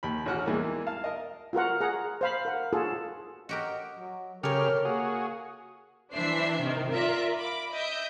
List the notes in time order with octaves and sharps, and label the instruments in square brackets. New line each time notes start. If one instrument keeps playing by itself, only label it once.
[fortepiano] D#2 B5
A1 C#4 F#4 F#5 F6
E2 E3 G3 G#3 A#3
F5 A5
A#4 D#5
[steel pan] F4 F#4 A#4 F#5
G#4 F#5 A#5
C5 F5 B5
A#4 F#5
F4 F#4 G#4 A4
[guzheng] F#4 G4 A#4 [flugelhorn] D#5
[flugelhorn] F#3
[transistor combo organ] C#3 G4 F6 [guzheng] A4 C#5 [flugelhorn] A#4
[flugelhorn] A#3 [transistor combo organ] F#4 G#4
[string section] E3 D4 C5 E5 C7
C3 D#3
F4 A#4 D5 E5
B5 D6
D#5 E5 G6